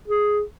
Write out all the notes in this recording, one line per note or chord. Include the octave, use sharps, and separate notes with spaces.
G#4